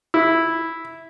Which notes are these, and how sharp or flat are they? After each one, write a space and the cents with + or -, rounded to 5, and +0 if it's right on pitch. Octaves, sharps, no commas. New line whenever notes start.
E4 -5